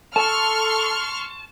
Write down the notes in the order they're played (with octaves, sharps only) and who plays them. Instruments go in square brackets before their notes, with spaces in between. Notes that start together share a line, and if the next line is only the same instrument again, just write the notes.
[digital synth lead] A4 [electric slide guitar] A5 [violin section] C6 C#6 F6